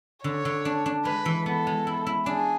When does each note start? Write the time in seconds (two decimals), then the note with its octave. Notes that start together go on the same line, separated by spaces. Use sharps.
0.24 D3 C#5
0.45 D3
0.65 D4
0.86 D4
1.05 G#3 B4
1.26 E3
1.46 B3 A4
1.67 G#3
1.87 E4
2.07 E4
2.26 D4 G#4